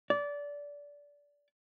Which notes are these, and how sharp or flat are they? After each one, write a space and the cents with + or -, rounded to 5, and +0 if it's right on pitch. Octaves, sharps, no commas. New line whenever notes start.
D5 -20